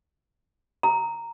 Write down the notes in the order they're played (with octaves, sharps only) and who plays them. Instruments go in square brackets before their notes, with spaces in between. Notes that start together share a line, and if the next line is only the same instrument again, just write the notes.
[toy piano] A#5